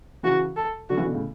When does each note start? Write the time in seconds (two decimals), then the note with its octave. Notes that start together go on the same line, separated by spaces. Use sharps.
0.23 C#3 E3 F#4
0.56 A4
0.90 D3 F#3 F#4
0.97 C#3 E3
1.05 B2 D3
1.14 A2 C#3